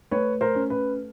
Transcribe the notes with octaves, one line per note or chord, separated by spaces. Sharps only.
A3 B4 C#5
A#4 C5
C#4
B4